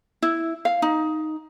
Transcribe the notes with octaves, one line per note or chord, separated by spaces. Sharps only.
E4
F5
D#4